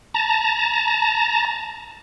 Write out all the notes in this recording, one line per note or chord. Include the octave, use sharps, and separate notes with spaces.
A5 A#5